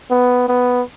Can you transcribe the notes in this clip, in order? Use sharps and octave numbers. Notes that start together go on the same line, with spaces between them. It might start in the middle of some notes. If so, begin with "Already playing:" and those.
B3
B3